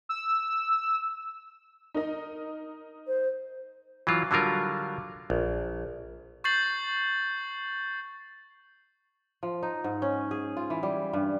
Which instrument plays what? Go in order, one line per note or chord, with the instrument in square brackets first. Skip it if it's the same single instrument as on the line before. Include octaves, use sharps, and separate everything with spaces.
[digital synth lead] E6
[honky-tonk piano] D#4 A#4 D#5
[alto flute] C5
[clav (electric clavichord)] E3 F#3 F4
D3 F#3 G3 F4 A#4
A#1
[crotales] C#6 G6 A6 C7 F#7
[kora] F3
D#4
G#2
C#4
G#4
F4
E3
G3
G2